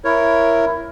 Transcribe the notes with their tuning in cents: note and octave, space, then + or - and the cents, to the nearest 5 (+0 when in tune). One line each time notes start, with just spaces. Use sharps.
E4 +15 A#4 +5 C#5 +0